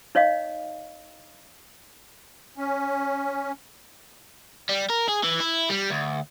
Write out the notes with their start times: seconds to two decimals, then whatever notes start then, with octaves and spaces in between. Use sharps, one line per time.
0.15 D#4 C#5 D#5 F5
2.58 C#4
4.69 G3
4.90 A#4
5.08 G#4
5.24 E3
5.40 E4
5.69 G3
5.91 D2